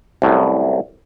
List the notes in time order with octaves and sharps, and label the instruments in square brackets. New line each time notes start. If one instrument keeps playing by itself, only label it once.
[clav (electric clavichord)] C2 F#2 A2